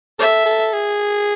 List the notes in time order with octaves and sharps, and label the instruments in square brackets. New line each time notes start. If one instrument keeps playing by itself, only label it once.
[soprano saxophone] A4 [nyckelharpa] E5
[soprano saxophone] A4
G#4